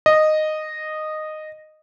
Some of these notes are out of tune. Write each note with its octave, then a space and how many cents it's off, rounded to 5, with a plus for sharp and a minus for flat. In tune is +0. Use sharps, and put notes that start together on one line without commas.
D#5 -10